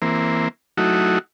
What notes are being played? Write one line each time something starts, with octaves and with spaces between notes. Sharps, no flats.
E3 A#3 C4
F#3 A3 D#4 E4 F#4